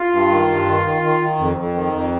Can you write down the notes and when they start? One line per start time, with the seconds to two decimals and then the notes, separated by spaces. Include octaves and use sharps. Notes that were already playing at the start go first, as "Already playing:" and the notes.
Already playing: F4
0.12 G2
0.29 D#3
0.48 G2
0.66 D#3
0.84 D#3
1.02 D#3
1.20 D#3
1.38 F2
1.56 F2
1.74 D#3
1.92 F2